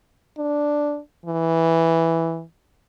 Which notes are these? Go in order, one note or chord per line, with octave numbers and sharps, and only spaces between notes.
D4
E3